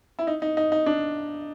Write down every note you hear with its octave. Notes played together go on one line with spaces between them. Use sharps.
E4
D#4
D#4
D#4
D#4
D4